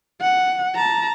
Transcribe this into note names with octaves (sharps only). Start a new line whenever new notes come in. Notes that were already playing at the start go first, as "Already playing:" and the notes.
F#5
A5 A#5